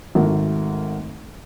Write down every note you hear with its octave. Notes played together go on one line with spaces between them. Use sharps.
G#1 A3 A#4 F#5